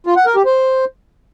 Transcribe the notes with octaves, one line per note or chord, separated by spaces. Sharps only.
F4
F#5
A#4
G4
C5